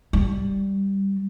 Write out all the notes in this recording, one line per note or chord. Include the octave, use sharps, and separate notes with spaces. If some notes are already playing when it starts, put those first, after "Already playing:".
G3